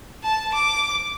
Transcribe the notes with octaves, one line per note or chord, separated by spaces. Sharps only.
A5
D6